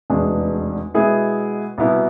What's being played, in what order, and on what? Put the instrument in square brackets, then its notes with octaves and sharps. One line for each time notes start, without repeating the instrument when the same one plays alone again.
[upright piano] F1 E2 B2 G#3 D4
B2 G#3 B3 E4 G#4
C2 B2 B3 E4